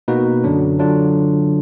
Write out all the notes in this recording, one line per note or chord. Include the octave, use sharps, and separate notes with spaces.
B2 A#3 D#4 F#4 B4
F#2 D3 F#3 D4
D3 F#3 D4 F4